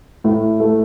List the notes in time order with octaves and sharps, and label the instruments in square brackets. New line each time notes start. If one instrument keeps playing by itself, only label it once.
[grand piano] A2
A3